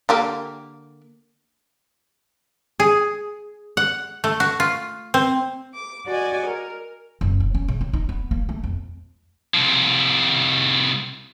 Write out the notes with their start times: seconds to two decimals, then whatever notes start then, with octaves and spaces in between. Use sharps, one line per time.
0.09 D3 A#3 G4
2.80 G#4
3.77 F#5
4.24 A3
4.40 F#4
4.60 F4
5.14 C4
5.74 D6
6.08 F#4 D5 D#5 G#5
6.46 A#4
7.21 F#1
7.40 G2
7.55 C#4
7.68 C#3
7.81 C4
7.93 D#4
8.09 B3
8.31 A#3
8.49 A3
8.64 F2
9.54 C2 F3